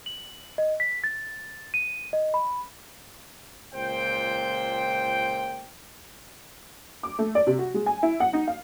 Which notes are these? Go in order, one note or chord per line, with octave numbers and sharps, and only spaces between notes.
F#7
D#5
B6
A6
D#7
D#5
B5
C#2 A#2 C5 G5
D6
A3
D5
C3
F#4
G#3
G#5
E4
F#5
D#4
F5